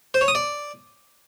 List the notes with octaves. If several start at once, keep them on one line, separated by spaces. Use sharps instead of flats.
C5
C#5
D#6
D5